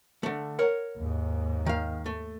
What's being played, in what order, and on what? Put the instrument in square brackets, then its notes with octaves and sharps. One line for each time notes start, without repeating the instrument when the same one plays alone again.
[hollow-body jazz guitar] D3 A3
A#4 C#5 F#5
[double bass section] D#2 G#2
[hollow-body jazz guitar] D#3 F5
A3